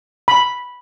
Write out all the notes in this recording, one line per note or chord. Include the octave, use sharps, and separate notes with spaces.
B5